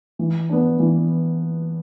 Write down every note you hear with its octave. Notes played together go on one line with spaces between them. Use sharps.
E3
B3 D4
E3